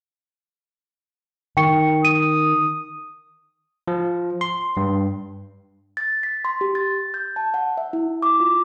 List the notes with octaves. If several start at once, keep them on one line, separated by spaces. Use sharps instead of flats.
D#3 G5 C#6 C#7
D#6 D#7
F3
C6
G2
A6
B6
C6
G4
A6
G6
A5
F#5
E5
E4
D6
F4